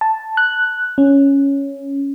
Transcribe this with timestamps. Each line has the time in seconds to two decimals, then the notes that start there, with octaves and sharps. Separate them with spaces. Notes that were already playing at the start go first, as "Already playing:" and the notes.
0.01 A5
0.37 F#6
0.98 C#4